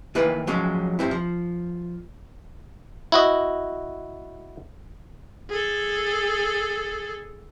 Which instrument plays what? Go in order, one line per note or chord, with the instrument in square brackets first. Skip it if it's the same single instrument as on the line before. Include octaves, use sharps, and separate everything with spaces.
[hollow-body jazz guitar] D#3 E3 A#3 E4 B4
F3 F#3 G#3 C#4
G2 C4 E4
F3
[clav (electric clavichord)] E4 F#4 D#5
[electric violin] G#4 A4